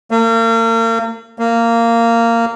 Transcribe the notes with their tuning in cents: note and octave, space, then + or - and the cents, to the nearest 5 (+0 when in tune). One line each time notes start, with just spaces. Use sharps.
A#3 -40
A#3 -15